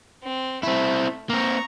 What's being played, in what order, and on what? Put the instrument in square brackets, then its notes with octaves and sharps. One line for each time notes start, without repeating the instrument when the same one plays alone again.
[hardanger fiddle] C4
[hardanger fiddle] A3 [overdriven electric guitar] C4 E4
[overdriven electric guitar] A#3 C4 [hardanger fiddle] A#5 C#6